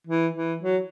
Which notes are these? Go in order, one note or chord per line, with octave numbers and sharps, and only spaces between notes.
E3
E3
F#3